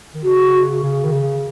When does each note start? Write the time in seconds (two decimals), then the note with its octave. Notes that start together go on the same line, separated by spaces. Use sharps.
0.15 D#3
0.23 C#3 F#4
0.83 C#3
1.05 D#3
1.13 C#3